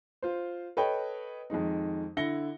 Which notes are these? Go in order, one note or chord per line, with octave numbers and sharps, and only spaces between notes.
F4 C5
A4 B4 C#5 D#5 G5
F2 D#3 G#3 D#4
D3 E4 A#6 C#7 G7